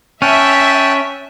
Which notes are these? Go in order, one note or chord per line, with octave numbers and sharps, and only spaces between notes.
C#4 E5 G5 A5 F#6